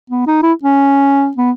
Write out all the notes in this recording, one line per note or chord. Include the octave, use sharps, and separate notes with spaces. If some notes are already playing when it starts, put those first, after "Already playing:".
B3
D#4
E4
C#4
B3